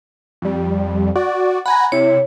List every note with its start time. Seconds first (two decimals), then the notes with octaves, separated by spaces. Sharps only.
0.42 F2 G3
1.15 F#4 D5
1.66 F#5 G#5 A#5 B5
1.92 C3 E4 C#5